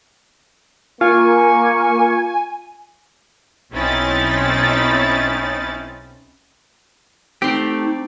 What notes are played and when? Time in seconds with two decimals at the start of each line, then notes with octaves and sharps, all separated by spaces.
1.01 A#3 F4 G#5 C#6
3.73 B1 C4 C#4 D#4 E4 A6
7.42 A3 C4 D#4 G4 C6